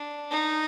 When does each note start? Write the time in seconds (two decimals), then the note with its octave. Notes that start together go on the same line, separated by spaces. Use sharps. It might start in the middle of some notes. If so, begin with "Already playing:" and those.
Already playing: D4
0.31 D#4